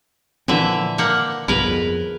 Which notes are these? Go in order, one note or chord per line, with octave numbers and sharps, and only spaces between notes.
A#2 D3 E3 F3 C4 E5
A#3 F#5 D6 F6 G6
B1 G2 F3 B3 G#4 A#4 B4
F2